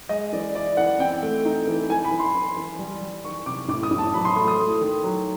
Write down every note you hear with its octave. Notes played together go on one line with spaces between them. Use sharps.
G#3 D#5
E3 D5
E4 D5
E3 F#5
C4 G5
A3
D#4
E3
E3 G#5
B5
E3
C6
E3
E3
G3
G3
D#3 C#6
C3 D6
A2 D6
D#6
A2
A5
F#3 B5
C6
A3 C6
D#6
A3
D#3
F#3